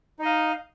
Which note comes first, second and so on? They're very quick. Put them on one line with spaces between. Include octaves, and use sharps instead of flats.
D#4 D#5 F5